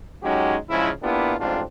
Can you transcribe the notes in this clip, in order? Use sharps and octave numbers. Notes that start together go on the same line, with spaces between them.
F#3 G#3 C#4 D#4 F#4 G4
G#2 C#3 F3 G#3 E4
A#3 B3 D4 E4 F4 G4
A1 F2 G#2 C4 D4 F4